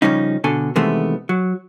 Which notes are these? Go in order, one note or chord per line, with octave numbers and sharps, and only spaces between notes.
C#3 F3 G3 C#4 D#4
B2 D3 A4 G#5
C3 D#3 E3 G#3 A3 B3
F#3